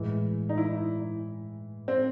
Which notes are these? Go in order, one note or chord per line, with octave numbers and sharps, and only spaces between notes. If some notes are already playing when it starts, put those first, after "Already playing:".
Already playing: A2 E3 G#3
D#4
E4
C4